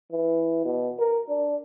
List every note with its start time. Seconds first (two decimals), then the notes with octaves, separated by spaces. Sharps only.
0.12 E3
0.65 B2
0.99 A#4
1.29 D4